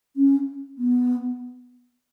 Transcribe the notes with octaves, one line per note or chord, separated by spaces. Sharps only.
C#4
B3